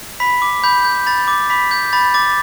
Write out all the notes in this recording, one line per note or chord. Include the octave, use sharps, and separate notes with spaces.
B5 B6
D6
B5 G6
G6
B5 A6
D6
B5 B6
G6
B5 A6
D6 A6